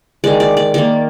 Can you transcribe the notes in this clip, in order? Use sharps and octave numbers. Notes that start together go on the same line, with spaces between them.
D#3 G#3 D5
D5
D5
D#3 A#3 D5